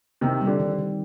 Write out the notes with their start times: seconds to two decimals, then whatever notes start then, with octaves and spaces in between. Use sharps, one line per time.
0.21 C3 D#3 C4
0.41 G3
0.47 D3
0.60 D#3
0.79 D#3